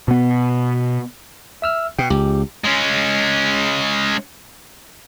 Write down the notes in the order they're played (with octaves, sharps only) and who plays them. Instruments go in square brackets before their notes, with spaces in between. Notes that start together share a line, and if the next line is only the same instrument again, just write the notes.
[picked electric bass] B2 B3
[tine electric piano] E5 E6 F6
[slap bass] B2 [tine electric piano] G5
[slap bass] C#2 [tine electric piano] G4
[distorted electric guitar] G#3 C#4